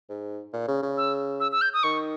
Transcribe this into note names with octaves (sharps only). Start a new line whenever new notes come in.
G#2
A#2
C#3
C#3
E6
E6
E6
G6
D#6
D#3 C#6